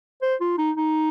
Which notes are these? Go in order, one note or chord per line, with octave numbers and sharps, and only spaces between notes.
C5
F4
D#4
D#4